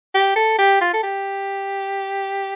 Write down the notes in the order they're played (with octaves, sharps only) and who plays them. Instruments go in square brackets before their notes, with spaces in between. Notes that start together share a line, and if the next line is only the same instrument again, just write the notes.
[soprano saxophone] G4
A4
G4
F4
A4
G4